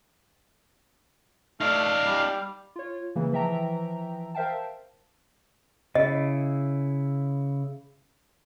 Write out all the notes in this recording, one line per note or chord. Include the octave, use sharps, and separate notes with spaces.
A3 D#4 D5 F5
G3
F4 C#5
C#3 E3 A#3
E3 F3 E5 G5 A#5
A#4 C5 E5 F5 G5 A5
C#3 E4 D#5